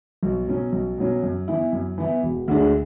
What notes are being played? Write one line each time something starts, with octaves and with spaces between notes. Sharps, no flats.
B1
B2 F#3 C#4
B1
B2 F#3 C#4
F#2
E3 B3 E4
F#2
E3 B3 E4
E1
D2 D3 G#3 D4